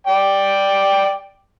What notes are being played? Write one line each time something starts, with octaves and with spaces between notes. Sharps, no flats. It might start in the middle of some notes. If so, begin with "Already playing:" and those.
D5 G5